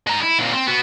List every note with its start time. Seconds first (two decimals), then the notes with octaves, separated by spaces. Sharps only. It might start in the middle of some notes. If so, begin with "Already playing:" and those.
0.07 G#3 A#5
0.22 E4
0.39 A#2 C4
0.53 C4
0.67 B3 F#4